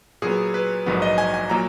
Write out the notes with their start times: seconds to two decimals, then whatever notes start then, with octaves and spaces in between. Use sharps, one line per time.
0.22 A#2 F#3 B3 G#4
0.54 B4
0.86 A#1 G#2 D#3 F#3 B3
1.02 D#5
1.18 G#5
1.34 G#5
1.50 A#2 F#3 A#3 A#5